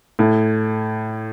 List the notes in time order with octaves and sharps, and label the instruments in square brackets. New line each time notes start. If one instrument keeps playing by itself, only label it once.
[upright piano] A2